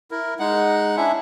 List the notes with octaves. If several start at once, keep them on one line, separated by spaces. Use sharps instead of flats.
E4 A#4
G#3 D#4 F#5
C#4 D4 E4 E5